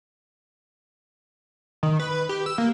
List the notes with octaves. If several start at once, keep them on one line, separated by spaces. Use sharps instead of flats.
D#3
B4
G4
E6
A#3